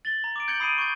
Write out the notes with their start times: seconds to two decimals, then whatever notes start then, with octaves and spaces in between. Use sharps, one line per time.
0.05 A6 F#7 G7
0.24 A#5
0.36 D6 D7
0.48 G6 G#6 C#7 F#7 G7
0.60 B5 D#6 C7 D7 D#7
0.78 C#6 G6 G#6